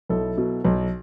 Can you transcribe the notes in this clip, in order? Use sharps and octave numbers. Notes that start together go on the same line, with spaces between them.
B1 E4 A4
B2 F#3
B1